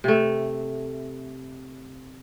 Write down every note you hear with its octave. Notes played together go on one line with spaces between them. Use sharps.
C3 A3